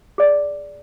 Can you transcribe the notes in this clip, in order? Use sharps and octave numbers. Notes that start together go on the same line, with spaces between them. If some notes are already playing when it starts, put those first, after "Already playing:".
G#4 D5